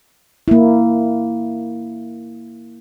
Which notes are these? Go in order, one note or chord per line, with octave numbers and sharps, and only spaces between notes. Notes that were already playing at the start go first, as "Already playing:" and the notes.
A#3 E4